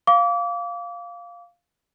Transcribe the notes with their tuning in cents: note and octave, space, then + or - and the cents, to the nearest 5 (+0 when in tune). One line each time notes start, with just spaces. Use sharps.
F5 +0 D6 -30